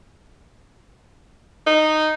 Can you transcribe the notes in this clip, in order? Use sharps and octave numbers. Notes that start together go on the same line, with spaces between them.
D#4